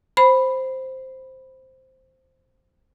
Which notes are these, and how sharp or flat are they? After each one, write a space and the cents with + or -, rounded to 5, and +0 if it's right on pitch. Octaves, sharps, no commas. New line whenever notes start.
C5 +0 B5 +0